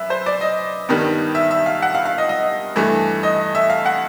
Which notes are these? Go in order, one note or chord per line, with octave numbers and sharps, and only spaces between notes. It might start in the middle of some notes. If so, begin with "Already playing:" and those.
Already playing: F#2 B4 E5
C5
D5
D#5
G2 D#3 G3 B3
E5
E5
F5
F#5
F5
F5
D#5
D#5
G2 E3 A3
D#5
E5
F5
F#5